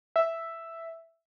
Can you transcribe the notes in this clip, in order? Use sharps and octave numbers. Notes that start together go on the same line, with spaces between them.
E5